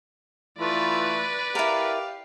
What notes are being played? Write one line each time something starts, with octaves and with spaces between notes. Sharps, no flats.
E3 A3 F4 B4 D5
E4 G4 A#4 F5